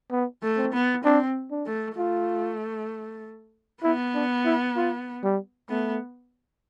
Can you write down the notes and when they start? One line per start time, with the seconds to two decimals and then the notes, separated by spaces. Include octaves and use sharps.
0.11 B3
0.43 A3
0.57 C4
0.73 B3
1.04 C4 D4
1.51 D4
1.66 A3
1.97 A3 F4
3.83 B3 E4
4.14 D4
4.46 E4
4.76 F4
5.24 G3
5.70 A3 B3